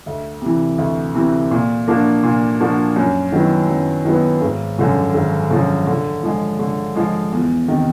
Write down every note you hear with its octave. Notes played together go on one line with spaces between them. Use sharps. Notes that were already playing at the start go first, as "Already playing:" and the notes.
D2
C3 E3
D2
C3 E3
A#2
F3 A#3 D4 F#4
A#2
F3 A#3 D4 F#4
F#2
D#3 F#3 B3 E4
F#2
D#3 F#3 B3 E4
G#1
F#2 D3 F3
G#1
F#2 D3 F3
D3
F3 G#3
D3
F3 G#3
E2
C3 D#3